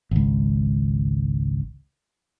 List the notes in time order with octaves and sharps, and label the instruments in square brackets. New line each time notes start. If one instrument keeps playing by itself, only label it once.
[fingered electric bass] G#1 C#2